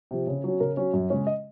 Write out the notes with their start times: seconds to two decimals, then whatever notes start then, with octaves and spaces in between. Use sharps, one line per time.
0.11 C3 F3
0.27 C#3
0.44 F#3 C#4
0.60 C#3 A#4
0.77 F#3 C#4
0.93 F#2
1.10 C#3 G#3 C#4 C#5
1.27 D#5